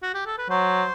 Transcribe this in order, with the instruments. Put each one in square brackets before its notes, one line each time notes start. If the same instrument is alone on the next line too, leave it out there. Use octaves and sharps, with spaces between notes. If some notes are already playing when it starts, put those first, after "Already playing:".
[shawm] F#4
G4
A4
B4
[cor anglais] F#3 [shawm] C5